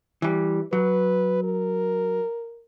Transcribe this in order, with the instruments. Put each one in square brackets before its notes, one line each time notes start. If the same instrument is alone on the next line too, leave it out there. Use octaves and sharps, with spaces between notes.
[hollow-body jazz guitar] E3 G3
[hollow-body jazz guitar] F#3 [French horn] B4
[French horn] A#4